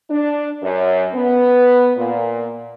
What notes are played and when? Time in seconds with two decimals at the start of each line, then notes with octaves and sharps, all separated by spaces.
0.10 D4
0.63 F#2
1.14 B3
1.97 A#2